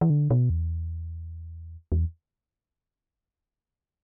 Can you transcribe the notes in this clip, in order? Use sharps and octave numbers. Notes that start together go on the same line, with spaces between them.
E3
D3
B2
E2
E2